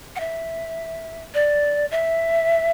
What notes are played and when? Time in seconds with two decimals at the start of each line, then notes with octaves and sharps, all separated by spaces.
0.16 F#5
0.20 E5
1.34 D5
1.91 E5